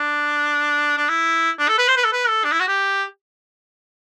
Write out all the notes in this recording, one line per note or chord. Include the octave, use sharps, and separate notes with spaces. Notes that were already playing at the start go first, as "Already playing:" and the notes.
Already playing: D4
D4
E4
D4
A4
B4
C5
B4
A4
B4
A4
D4
E4
F#4
G4